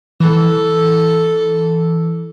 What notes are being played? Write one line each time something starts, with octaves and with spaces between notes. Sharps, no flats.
E3 A4